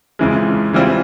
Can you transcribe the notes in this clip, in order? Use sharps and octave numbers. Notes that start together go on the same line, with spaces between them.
F2 C#3 E3 G#3
C#3 E3 G3 C4 F4